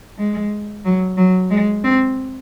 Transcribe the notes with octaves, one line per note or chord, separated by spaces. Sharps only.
G#3
F#3
F#3
G#3
C4